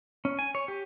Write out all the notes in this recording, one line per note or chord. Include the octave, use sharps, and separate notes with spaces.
C#4
G#5
C#5
G4